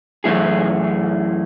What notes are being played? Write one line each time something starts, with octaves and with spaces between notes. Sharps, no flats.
F#2 E3 A3 E4 G#4